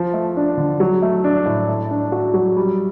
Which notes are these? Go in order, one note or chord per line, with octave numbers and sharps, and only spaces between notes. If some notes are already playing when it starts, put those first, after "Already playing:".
Already playing: F3
A3
D4
D3
F#3
A3
D4
A2
A3
D4
F#4
F#3
G3